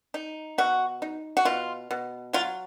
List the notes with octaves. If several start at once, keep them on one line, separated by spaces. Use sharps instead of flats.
D#4
B2 F#4
D#4
F#4
B2 F4
B2
F#3 F4